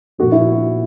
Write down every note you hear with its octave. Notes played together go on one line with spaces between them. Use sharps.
A#2 F3 F#4
E4